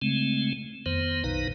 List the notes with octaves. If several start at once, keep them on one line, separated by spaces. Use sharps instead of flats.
C#3 G#3 A3 C4
F2 D#3 B3 C5
A#1 B2 D#3 D#4 B4